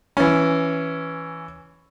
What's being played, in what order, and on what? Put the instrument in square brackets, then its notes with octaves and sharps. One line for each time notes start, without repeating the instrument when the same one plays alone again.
[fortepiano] E3 C#4